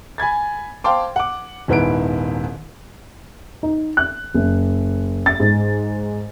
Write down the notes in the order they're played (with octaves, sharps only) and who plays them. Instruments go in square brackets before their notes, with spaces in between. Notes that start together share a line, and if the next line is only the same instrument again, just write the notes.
[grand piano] G#5 B5 G#6 A6
C5 F5 G5 A5 C6 D6
F#5 D6
D#1 G#2 B3 E4 D7
[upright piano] D#4
F#6
F#1
A6
G#2